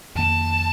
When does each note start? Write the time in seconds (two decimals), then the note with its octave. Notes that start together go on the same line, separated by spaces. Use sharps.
0.15 F2 D#3 A#3 A5